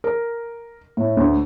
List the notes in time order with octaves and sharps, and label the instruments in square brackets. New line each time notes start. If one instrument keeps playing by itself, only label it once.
[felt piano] A#4
A2
D2